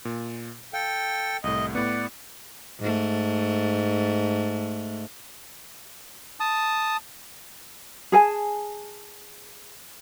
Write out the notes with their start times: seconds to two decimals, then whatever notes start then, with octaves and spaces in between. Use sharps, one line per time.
0.05 A#2
0.73 A4 F5 G5
1.44 C2 A2 D#5
1.75 A2 B3 D5 F#5
2.80 G#2 A3
6.40 A5 D#6
8.12 G#4 A4 G#5 A5